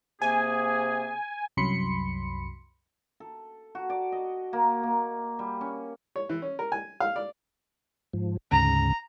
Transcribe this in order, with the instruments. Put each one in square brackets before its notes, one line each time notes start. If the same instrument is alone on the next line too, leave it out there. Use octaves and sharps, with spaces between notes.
[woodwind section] C3 A#3 G#4 [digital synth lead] G#5
[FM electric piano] C2 F#2 F#3 B5 C6 C#7
[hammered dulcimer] A4
F#4
D5
D#5
A#3
A#3
G3
C#4
[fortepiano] C#5
E3
C#4
A#4
G#5
F5
D5
[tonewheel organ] G#2 F3
[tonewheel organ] D2 G#2 C#3 [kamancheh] A#5